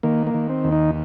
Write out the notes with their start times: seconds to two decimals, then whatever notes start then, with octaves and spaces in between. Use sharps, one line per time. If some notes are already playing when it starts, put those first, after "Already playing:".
0.03 D#3 A#3
0.27 A#3
0.34 D#3
0.49 C4
0.64 D#2
0.72 D#4